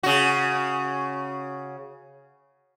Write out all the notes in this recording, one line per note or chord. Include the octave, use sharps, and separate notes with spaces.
C#3 F#4